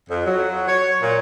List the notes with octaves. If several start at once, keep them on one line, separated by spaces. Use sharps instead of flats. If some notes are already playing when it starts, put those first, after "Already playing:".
F2
F#3
C#5
A#2